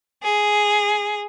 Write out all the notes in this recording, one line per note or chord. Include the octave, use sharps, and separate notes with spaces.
G#4